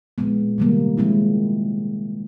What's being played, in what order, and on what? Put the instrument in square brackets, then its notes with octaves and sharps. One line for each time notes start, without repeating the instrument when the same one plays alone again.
[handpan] A#2 F3 G#3 B3
C3 D#3 G3 A#3
F3 G#3 C4 E4